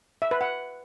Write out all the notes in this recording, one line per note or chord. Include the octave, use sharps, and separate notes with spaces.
E5
B4
F#5